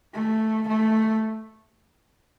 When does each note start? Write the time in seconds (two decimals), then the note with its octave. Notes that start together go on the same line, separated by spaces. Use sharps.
0.14 A3
0.68 A3